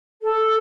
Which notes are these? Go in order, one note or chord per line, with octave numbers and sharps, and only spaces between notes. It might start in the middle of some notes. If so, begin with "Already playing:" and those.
A4